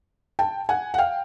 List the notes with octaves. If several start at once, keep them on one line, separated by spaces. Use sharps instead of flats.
G5 A5
F#5 G#5
F#5
F5 G5